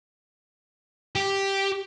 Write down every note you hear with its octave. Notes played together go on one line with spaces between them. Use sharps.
G4